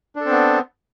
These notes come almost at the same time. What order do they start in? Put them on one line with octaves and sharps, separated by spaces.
D4 A4 C4 B3